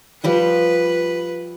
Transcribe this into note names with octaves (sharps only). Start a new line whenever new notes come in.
F3 G3 G4 B4